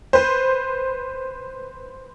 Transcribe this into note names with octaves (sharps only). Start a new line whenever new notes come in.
B4 C5